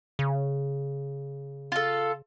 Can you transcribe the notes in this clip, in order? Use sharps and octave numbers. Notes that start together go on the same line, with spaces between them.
C#3
F4 A4